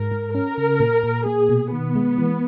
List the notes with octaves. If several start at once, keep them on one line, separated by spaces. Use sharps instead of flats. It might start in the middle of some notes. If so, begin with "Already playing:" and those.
Already playing: G#2 G#3 A#4
G#2
C#4 A#4
C#3
A#2
A#2
A#3 G#4
B2
D#3 B3
G#3
E3